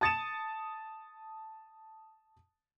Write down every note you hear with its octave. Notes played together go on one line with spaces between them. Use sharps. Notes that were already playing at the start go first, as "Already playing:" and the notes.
A5 D#6 A6 C#7 D#7 E7